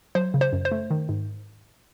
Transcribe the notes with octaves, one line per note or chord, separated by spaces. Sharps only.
F#3 C5
C#3
C5
F#2
C5
A3
D#3
G#2